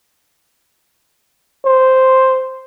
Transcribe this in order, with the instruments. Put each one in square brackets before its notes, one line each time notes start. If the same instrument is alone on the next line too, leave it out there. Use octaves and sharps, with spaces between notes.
[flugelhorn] C5